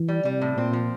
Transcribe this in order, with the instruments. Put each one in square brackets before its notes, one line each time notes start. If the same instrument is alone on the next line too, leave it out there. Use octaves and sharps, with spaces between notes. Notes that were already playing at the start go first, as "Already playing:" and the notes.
Already playing: [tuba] E3
[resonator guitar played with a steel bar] G3
[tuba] C3 [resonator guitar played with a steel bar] G3
[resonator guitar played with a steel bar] A2
[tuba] A#2 [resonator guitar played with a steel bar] C4
[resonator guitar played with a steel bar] F3